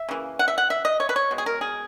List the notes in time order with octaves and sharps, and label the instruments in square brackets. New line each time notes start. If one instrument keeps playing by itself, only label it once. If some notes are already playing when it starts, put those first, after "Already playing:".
Already playing: [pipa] E5
C#3 E3 A#3
F#5
E5
F#5
E5
D#5
C#5
B4
C#5
B2 G#3
G#4
A#4
G#4